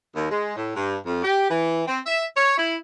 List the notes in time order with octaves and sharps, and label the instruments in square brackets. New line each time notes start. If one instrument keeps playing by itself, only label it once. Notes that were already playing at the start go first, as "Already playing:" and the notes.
[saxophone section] D#2
G#3
A2
G2
F2
G4
E3
C4
E5
C#5
E4